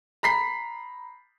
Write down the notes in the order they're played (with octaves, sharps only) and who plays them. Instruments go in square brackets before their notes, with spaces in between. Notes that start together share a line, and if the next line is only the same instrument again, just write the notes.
[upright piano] A#5 B5 B6 C7